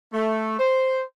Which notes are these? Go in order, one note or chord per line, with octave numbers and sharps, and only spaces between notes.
A3
C5